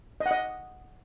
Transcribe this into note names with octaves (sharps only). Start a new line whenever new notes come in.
D#5
F#5
D#5